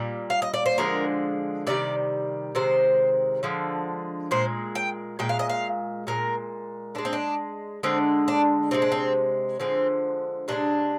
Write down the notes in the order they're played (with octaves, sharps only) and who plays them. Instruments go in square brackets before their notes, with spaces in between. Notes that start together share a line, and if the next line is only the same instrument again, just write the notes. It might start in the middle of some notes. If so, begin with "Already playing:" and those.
Already playing: [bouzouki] A#2 G3
F5
D#5
D5
C5
D3 F3 G#3 A#4
C3 D#3 G3 D5
C3 D#3 G#3 C5
D3 F3 G#3
A#2 G#3 C5
G5
A#2 G#3 G5
F5
D#5
F5
A#2 G#3 A#4
D3 G#3 D4
C4
D4
D3 G#3 C4
D4
C3 F3 G#3 C4
D4
C4
D3 F3 G#3 C4
C3 F3 G#3 D4